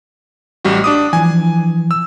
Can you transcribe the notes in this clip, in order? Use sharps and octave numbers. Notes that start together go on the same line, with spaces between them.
A1 G3 F#4
D4 D6 D#6
E3 F3 G#5
E6